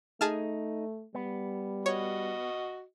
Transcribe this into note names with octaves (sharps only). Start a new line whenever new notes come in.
A3 D#4 G#4 A5 F6
G3 B3
F#4 C#5 D#5